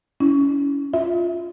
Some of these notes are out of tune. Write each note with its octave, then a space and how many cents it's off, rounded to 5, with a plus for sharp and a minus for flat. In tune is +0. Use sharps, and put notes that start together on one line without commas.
C#4 +25 E4 -10
F4 +0 E5 +0